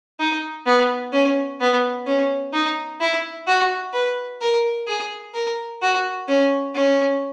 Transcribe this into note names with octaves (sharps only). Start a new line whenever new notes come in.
D#4
B3
C#4
B3
C#4
D#4
E4
F#4
B4
A#4
G#4
A#4
F#4
C#4
C#4